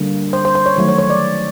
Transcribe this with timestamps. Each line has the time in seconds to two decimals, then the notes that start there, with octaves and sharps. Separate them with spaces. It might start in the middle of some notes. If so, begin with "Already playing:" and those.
Already playing: D3 G3 A#3
0.33 C5
0.45 C5
0.55 C5
0.66 C#5
0.76 D#3 F#3 A3 C#5
0.88 C#5
0.99 C#5
1.10 D5